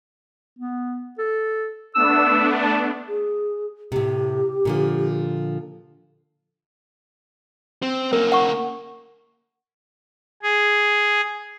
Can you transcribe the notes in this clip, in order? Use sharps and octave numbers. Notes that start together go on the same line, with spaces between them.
B3
A4
A3 B3 D4 E6
A5
G#4
A2 C3 G4
A#2 D3 F3
C4
A#3 C#4 A#4
F#5 C#6
G#4